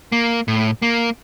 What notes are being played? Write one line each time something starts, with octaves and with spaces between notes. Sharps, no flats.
A#3
A2
A#3